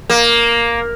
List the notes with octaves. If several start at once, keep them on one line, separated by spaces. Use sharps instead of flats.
A#3